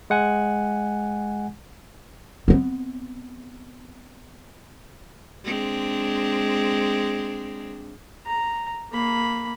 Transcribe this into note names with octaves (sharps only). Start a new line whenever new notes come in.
G#3 F#5 G#5
B3 C4
G#3 C4 D4
A#5
A#3 B5